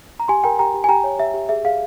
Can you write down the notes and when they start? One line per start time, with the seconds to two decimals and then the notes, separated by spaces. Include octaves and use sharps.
0.20 A#5
0.28 G4 G#5 C6
0.44 A#4 G5 A#5
0.59 G4 G5 A#5
0.74 G4
0.84 G#5
0.88 G4 G5 A#5
1.04 C#5
1.19 G4 E5
1.34 G4
1.49 G#4 E5
1.64 G#4 F5